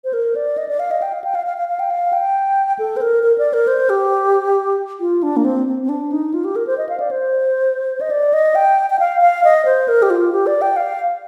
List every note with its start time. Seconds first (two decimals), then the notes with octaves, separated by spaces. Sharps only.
0.04 C5
0.13 A#4
0.35 D5
0.58 D#5
0.68 D5
0.80 F5
0.91 D#5
1.02 G5
1.13 F5
1.24 G5
1.35 F5
1.46 F5
1.57 F5
1.68 F5
1.80 G5
1.90 F5
2.13 G5
2.79 A4
2.97 C5
3.01 A#4
3.23 A#4
3.38 D5
3.53 A#4
3.67 C5
3.90 G4
5.00 F4
5.23 D4
5.37 A#3
5.45 C4
5.67 C4
5.82 C4
5.89 D4
6.12 D#4
6.34 F4
6.45 G4
6.56 A#4
6.67 C5
6.78 D#5
6.89 F5
7.00 D5
7.11 C5
8.01 D#5
8.10 D5
8.33 D#5
8.55 G5
8.90 G5
8.99 F5
9.21 F5
9.44 D#5
9.65 C5
9.88 A#4
10.02 G4
10.10 F4
10.33 G4
10.47 D5
10.62 G5
10.76 F5